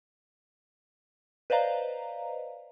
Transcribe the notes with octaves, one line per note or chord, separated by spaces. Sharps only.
B4 C5 D5 D#5 F5 A#5